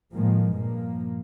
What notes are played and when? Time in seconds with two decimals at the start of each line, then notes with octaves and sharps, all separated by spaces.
0.14 A2 D#3 F3 G#3 A#3
0.54 G2 A#2 F3 A#3